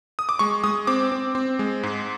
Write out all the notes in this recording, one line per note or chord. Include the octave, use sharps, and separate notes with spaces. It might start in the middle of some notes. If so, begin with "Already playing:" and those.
D#6
D6
G#3 C#6
G#3 D#6
C4 D6
C4
C4
G#3
G#2